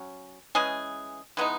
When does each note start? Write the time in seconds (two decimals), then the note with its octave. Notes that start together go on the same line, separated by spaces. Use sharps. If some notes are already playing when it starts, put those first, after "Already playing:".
Already playing: F#3 C#4
0.55 E3 G#3 C#4 G#4
1.37 E3 G#3 B3 D#4